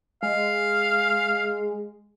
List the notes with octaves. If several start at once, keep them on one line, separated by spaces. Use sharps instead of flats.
G#3 F5